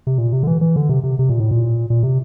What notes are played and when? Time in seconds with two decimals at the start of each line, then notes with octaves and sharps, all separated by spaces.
0.07 C3
0.18 A#2
0.33 C3
0.43 D3
0.47 E3
0.61 E3
0.76 D3
0.89 C3
1.04 C3
1.19 C3
1.29 A#2
1.40 A2
1.51 A#2
1.90 A#2
2.03 C3